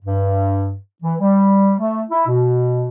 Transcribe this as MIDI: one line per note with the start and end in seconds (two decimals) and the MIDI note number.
0.03 0.75 43
1.03 1.14 52
1.20 1.74 55
1.80 2.02 57
2.10 2.23 64
2.28 2.87 47